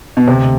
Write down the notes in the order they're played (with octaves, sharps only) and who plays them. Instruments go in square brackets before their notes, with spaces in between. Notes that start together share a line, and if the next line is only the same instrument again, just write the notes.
[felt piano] B2
[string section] D2 [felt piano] C3